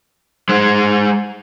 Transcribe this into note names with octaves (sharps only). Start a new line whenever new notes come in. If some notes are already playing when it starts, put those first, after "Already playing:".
G#3 C5